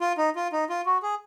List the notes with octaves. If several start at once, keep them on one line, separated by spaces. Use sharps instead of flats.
F4
D#4
F4
D#4
F4
F#4
G#4